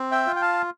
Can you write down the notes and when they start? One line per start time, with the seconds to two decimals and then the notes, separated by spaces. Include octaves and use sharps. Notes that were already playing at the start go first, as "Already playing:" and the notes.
Already playing: C4
0.11 E5 G5
0.27 F4
0.36 G5
0.42 F5 A5